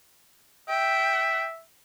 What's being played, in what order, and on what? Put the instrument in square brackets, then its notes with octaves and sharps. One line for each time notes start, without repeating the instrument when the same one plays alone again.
[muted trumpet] E5 [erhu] G5